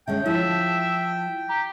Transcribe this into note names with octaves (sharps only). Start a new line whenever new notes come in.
D3 G#3 C#4 E5 G5
F3 E4 E5 A5
G4 A#5